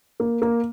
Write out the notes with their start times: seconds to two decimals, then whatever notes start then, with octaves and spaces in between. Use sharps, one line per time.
0.20 A#3
0.42 A#3